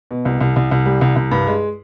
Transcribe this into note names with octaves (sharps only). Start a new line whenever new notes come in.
B2
C2
C2
C2
C2
G3
C2
C2
G2
G#3